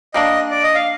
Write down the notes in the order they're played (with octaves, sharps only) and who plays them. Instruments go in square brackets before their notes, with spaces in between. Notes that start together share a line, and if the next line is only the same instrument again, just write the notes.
[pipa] G3 A#3 D4 [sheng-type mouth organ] D#5
[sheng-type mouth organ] D5
D#5
F5